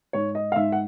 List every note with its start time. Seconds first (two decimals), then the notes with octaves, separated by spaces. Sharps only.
0.13 G#2 C#5
0.35 D#5
0.52 F5
0.56 G#2 E5
0.72 F#5